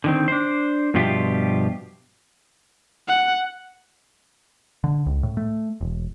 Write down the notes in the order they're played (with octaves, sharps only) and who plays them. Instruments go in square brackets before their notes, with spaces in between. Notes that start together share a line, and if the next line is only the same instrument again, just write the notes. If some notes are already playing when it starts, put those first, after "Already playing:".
[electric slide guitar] D3 D#3 C4
D4 C5
G2 B2 F3 F4 G4 E5
[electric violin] F#5
[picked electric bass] D3
C#2
A2
A3
E1